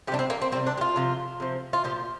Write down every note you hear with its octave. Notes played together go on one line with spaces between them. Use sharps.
C3 G3 D4 G4
C4
A#3
C4
C3 G3 C4
D4
G4
F4
C3 F3
C3 F3
F4
A#2 F3 G4